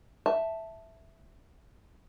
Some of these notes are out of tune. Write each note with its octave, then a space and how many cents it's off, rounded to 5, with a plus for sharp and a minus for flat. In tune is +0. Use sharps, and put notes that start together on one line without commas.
E5 +0 A5 +0